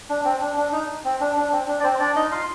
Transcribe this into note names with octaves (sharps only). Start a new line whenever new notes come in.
D4
C4
D4
D4
D#4
C4
D4
D4
C4
D4
D5
C4 C5
D4 D5
D#4 D#5
F4 F5